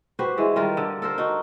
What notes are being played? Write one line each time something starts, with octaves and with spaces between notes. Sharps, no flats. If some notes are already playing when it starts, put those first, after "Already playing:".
F#4 G4 B4 C5
E3 G#3
D#3 G3 F4 A#4
D3
A4 A#4 C5
D#4 F#4